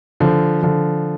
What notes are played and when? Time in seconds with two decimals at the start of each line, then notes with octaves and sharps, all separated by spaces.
0.20 D3 F3
0.62 D3 F3